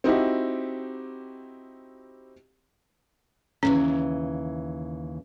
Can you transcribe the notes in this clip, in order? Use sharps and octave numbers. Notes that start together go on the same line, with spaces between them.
C4 D#4 E4 F#4 G4
D#2 C#3 E3 C#4